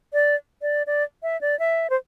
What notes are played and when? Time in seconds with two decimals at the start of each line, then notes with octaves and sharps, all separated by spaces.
0.13 D5
0.62 D5
0.87 D5
1.23 E5
1.41 D5
1.59 E5
1.90 C5